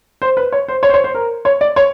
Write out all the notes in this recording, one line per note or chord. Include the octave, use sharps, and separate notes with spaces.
C5
B4
C#5
C5
C#5
C5
C#5
C5
A#4
C#5
D5
C#5